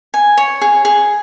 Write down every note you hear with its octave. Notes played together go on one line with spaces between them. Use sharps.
G#5
C#5
G#4
G#4